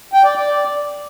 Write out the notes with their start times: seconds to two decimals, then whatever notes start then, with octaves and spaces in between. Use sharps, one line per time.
0.13 G5
0.24 D5
0.35 D5